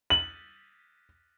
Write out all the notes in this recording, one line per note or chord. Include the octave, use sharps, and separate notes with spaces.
F#7